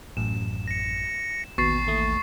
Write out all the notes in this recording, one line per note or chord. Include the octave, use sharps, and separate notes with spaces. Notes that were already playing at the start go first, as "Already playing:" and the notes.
A1 F#2 E7
A#6 C#7
A1 D#2 B2 C#6 A6 C7
D#2 A3 D#6